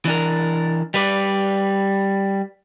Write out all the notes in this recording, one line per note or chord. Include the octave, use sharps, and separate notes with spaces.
E3 D4 A#4
G3 B4 D5